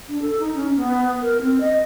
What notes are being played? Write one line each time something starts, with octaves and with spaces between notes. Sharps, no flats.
D4
A4
D#4
C#4
B3
A#4
C4
D#5